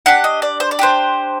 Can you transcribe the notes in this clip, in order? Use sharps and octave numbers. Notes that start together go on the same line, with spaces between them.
D4 G4 F#5
D#5
D5
C5
D5
D4 G4 C5